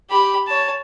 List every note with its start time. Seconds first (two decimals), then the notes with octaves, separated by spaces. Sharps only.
0.10 G4 B5
0.47 C#5 A5